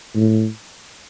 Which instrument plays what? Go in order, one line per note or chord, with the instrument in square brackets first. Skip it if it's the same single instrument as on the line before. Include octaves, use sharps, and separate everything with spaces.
[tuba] A2